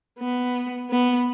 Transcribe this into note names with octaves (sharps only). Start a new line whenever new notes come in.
B3
B3